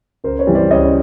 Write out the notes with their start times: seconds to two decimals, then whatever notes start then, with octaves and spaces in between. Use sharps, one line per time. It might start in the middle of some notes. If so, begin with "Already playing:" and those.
0.24 C#2 A#4 C5
0.39 B4 C#5
0.47 C3 E3 G3
0.55 C5 D5
0.71 C#2 C#5 D#5